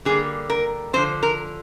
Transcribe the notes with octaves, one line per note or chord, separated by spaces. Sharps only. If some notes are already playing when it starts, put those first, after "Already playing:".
D3 G3 A#3 G#4
A#4
D3 F3 C4 C5
A#4